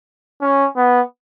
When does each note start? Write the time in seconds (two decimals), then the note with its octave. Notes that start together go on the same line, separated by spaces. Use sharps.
0.41 C#4
0.76 B3